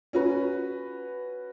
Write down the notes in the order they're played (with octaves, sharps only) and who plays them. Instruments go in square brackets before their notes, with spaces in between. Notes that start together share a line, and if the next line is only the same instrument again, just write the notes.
[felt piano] C#4 F#4 B4